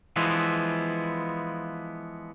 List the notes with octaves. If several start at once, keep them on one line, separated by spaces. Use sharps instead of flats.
E3 F3 G#3 B3 E4